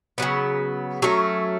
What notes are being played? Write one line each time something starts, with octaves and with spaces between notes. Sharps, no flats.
C#3 F#3 B3
F#3 A3 C#4